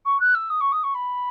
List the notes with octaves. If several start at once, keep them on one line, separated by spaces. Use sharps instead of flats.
C#6
F#6
E6
D#6
C#6
D#6
C#6
B5